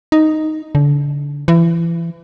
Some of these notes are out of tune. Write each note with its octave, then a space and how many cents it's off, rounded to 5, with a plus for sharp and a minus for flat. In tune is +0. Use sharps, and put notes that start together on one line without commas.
D#4 +0
D3 -30
E3 +30